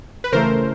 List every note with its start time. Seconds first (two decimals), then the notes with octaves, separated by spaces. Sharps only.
0.24 B4
0.32 C#3 E3 A3 A#4 C5